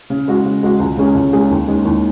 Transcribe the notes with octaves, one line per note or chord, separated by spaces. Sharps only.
C#3
G#3 F#4
C#3
G#3 F#4
C#2
C#3 G#3 C#4 G#4
C#2
C#3 G#3 C#4 G#4
D#2
D#3 G#3 C#4 G#4
D#2